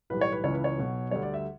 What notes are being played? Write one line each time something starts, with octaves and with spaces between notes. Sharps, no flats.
B1 A2 E3 G3 B4
C#5
B4
C#2 C#3 E3 C#5
B4
C#5
B1 B2 F#3
D2 D3 G3 C#5
D5
E5